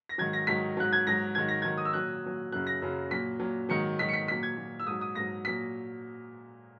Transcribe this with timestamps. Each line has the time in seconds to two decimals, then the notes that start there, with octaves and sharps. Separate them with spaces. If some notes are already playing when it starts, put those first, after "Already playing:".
0.09 A#6
0.18 G#2 D#3 F#3 G#6
0.33 A#6
0.47 G#2 D#3 F#3 B6
0.77 G#2 F#3 F#6
0.93 G#6
1.07 G#2 F#3 A#6
1.35 G#2 D#3 F#3 G#6
1.48 A#6
1.62 G#2 D#3 F#3 G#6
1.77 D#6
1.85 E6
1.93 A#2 F#3 F#6
2.23 A#2 F#3
2.52 F#2 C#3 F#3 F#6
2.67 A#6
2.82 F#2 C#3 F#3
3.10 A#2 F#3 B6
3.40 A#2 F#3
3.69 G#2 D#3 F#3 C#7
3.99 G#2 D#3 F#3 B6
4.09 C#7
4.13 B6
4.28 A#2 F#3 B6
4.43 G#6
4.57 A#2 F#3
4.80 E6
4.87 G#2 F#3 D#6
5.01 D#6
5.15 G#2 F#3 A#6
5.45 A#2 F#3 B6